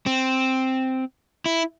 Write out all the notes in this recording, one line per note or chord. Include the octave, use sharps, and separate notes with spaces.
C4
E4